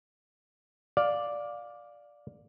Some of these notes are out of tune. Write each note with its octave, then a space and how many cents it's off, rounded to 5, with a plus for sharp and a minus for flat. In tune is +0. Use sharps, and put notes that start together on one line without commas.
D5 +0 F5 +15